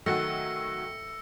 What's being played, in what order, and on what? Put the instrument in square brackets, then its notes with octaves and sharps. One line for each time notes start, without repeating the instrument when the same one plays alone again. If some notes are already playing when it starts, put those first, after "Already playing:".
[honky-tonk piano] D#3 F#3 F#4 [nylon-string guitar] A3 [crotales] E6 A#6 C#7